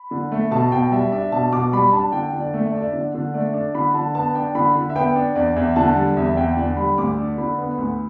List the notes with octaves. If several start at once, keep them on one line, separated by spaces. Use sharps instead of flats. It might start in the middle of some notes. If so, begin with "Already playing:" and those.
Already playing: B5
D3
A3
B2 A5
B2 G5
G3 E5
D4 E5
B2 A5
B2 D6
G3 B5
D4 A5
D3 G5
D3
D5
A3
D5
D4 E5
D5
D3
D3
A3 D5
D4
D3 B5
D3 A5
B3 A5
D4 G5
D3 B5
D3
E5
B3 G5
D4
E2 D5
E2 E5
D3 A5
G3
E2 E5
E2 G5
D3 D5
G3 B5
D2 D6
D4
D3 B5
B3
D2